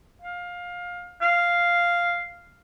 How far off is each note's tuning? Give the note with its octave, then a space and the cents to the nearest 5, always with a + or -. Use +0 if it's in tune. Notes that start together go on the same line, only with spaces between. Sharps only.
F5 +20
F5 -5